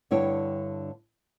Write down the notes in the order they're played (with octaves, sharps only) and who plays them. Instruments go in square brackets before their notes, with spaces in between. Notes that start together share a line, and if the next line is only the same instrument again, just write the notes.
[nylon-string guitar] G2 D3 E4 C#5 G5